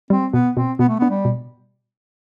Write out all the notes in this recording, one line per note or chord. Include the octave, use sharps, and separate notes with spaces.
G3 C4
B2 B3
B2 C4
B2 B3
A3
B3
D4
G3
B2